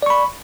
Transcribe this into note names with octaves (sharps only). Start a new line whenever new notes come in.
D5 B5 C#6